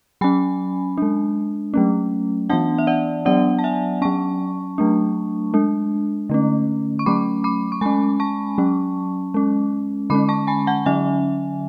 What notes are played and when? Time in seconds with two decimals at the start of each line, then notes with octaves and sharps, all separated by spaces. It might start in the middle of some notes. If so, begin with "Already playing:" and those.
0.21 F#3 C#4 G#5 B5
0.98 G#3 D4
1.74 F#3 A3 C#4
2.50 E3 B3 D4 F#5 A5
2.78 E5
2.87 D5 F#5
3.25 F#3 B3 D4 D5 F#5
3.59 A5
3.64 E5 G#5
4.02 F#3 C#4 A5 C#6
4.78 F#3 A3 D4
5.54 G#3 D4
6.29 D3 A3 C#4
6.99 C#6
7.06 F#3 A3 C#4 B5 D6
7.44 B5 D6
7.72 C#6
7.81 G#3 C#4 G#5 B5
8.20 A5 C#6
8.58 F#3 C#4
9.34 G#3 C#4
10.10 D3 G#3 C#4 B5 D6
10.29 A5 C#6
10.47 G#5 B5
10.67 F#5 A5
10.86 D3 F#3 C#4 E5 G#5